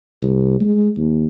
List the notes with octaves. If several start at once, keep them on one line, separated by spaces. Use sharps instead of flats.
C2
G#3
D#2